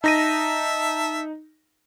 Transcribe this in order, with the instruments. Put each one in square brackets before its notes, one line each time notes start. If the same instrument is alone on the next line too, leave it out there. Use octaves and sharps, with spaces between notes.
[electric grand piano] D#4 A#6 D#7 [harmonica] E5 A5